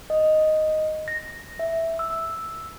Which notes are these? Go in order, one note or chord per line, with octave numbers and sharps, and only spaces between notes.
D#5
A#6
E5
E6